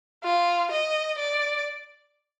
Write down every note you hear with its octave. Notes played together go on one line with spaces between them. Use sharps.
F4
D#5
D5